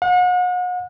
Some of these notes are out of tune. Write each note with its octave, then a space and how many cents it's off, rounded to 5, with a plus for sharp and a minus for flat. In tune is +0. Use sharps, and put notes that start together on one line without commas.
F#5 -40